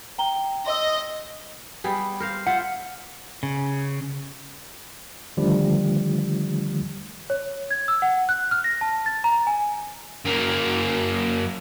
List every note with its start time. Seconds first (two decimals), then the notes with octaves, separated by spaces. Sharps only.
0.18 G5 A#5 G7
0.66 D#5 C6 E6
1.84 G3 B3 G#4
2.20 A#4 C5 F5
2.47 F4 C5 E5 F#5
3.43 C#3
5.37 D3 D#3 F3 G3 A3
7.30 C#5
7.71 G#6
7.88 E6
8.02 F#5
8.29 F#6
8.51 F6
8.64 A#6
8.81 A5
9.06 A6
9.24 A#5
9.47 G#5
10.25 F#2 A#3